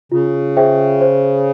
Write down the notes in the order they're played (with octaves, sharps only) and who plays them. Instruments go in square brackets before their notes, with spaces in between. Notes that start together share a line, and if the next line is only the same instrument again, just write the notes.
[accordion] C#3 [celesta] F4
[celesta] G#4 C5 E5 G5
C5